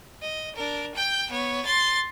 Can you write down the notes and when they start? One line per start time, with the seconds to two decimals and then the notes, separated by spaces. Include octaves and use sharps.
0.22 D#5
0.56 D4 A#4
0.95 G5 G6
1.30 B3 C#5
1.65 C6 A6